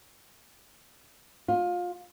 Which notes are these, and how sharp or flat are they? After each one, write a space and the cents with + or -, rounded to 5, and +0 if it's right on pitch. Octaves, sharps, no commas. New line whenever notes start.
F4 +25